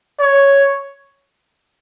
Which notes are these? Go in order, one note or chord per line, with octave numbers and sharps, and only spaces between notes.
C#5